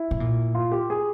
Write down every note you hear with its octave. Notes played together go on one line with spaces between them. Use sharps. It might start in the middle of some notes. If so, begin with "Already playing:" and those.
Already playing: E4
C3
A#2
F4
G4
G#4